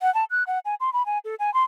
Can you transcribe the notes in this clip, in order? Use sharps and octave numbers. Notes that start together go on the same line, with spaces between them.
F#5
A5
F#6
F#5
G#5
C6
B5
G#5
A4
G#5
C6